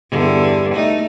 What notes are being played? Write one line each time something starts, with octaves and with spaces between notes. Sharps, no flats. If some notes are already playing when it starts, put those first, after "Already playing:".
E2 G2 D3
A3 D#4